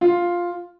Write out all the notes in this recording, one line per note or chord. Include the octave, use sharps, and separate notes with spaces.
F4